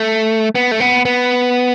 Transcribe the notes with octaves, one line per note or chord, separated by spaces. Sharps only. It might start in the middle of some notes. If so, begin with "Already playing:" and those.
Already playing: A3
B3
A3
B3
B3